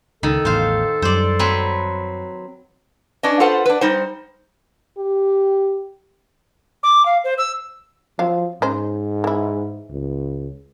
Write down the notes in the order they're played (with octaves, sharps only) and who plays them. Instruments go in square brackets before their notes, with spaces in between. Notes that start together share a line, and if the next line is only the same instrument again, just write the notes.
[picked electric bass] C#2 [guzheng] D#3 [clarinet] A4
[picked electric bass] A1 E2 [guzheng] C5 F5
[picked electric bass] F#2 G3 [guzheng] C5 D5
[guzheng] F#3 C4 B4
[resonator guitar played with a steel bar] C#4 D4 B4 D#5
F4 A4 B4 C5 F#5
D4 B4
G3 D#4 C5
[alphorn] G4
[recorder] D6
F5
C5
E6
[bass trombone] F3 [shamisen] F#3 C4 F5
[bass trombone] G#2 [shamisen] C#4 D#4 C5
[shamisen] E3 E4
[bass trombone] C#2